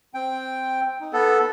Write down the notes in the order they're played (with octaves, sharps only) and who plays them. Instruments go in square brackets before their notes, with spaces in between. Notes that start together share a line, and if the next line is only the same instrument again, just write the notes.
[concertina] C4 G5
D#4
[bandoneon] B3 A4